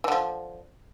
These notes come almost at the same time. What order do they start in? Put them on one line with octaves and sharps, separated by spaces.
E3 D3 F3